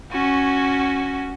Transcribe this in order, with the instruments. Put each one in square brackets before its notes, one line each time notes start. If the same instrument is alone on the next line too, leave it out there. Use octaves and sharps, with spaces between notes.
[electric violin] C#4 F#4